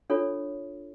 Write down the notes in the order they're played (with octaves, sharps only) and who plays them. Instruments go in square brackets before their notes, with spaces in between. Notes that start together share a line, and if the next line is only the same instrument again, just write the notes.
[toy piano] D4 F4 A4 C#5